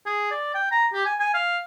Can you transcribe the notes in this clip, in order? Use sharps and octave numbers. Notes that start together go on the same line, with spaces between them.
G#4
D5
G5
A#5
G4
G#5
G#5
F5